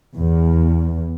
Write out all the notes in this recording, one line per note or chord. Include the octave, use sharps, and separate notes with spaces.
E2